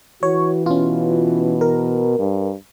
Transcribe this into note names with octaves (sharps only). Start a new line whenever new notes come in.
E3 F#4 C#5
B2 C#4 F4
A#4
G2